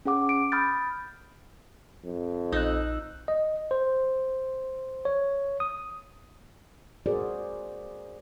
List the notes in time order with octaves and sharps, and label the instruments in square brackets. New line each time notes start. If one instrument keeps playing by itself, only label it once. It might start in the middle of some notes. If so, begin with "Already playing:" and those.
[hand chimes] C#4 G#4 F#5 D6
D7
B5 D#6 F6 G6 A6
[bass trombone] F2
[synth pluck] A#1 E6 F#6 [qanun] D#4
[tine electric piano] D#5
C5
C#5
D#6
[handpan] F#4 G#4 A#4 C5 D5